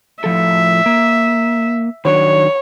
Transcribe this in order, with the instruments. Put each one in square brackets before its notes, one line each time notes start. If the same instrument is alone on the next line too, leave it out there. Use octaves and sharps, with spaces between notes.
[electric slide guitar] A2 F3 A4 [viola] E5
[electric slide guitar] A#3
[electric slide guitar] D#3 F#3 D4 [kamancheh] C#5